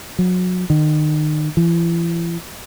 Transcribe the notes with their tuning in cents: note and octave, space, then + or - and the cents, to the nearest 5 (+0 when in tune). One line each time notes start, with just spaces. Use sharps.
F#3 -30
D#3 -30
E3 +40